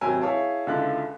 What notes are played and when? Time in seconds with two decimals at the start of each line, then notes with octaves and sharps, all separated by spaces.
0.01 G#1 C3 F#3 G5 G#5 E6
0.21 E4 G#4 C#5 F5 A5
0.67 C#2 D3 E4 F4 A4 F#6